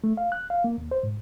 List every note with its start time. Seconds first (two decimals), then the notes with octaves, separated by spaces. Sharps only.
0.04 A3
0.17 F5
0.32 F#6
0.50 F5
0.64 A#3
0.78 D#2
0.91 C5
1.03 G#2